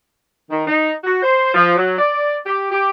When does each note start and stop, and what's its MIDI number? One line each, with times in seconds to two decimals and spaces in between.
0.50 0.64 51
0.67 0.93 63
1.04 1.20 66
1.23 1.54 72
1.55 1.75 53
1.77 1.96 54
1.99 2.37 74
2.46 2.68 67
2.71 2.90 67